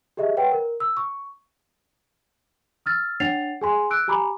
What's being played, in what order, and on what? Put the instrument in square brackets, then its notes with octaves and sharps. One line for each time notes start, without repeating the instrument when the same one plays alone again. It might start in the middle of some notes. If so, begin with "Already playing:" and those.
[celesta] G4 G#4 D#5 E5
B4 C#5 F#5 G5
A#4
E6
C#6
E6 F6 A6
D4 C#5 F#5 A6 C7 F7
G#4 G#5 C6
D6 E6 F#6 D7
G4 G#5 A#5 B5 D6